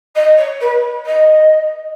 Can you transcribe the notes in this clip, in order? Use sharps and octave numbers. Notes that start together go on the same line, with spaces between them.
D#5
C#5
B4
D#5